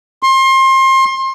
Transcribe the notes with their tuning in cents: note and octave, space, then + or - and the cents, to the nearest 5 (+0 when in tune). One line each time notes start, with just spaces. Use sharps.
C6 +30